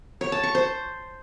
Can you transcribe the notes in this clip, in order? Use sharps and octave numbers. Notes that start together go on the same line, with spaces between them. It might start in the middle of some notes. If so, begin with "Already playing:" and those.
C#5
A5
C#6
C5